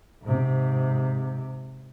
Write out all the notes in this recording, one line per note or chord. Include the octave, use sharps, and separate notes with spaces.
G#2 C3